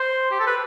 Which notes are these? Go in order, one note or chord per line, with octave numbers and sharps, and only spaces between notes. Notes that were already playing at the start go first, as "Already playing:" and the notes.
Already playing: C5
G4
A4
B4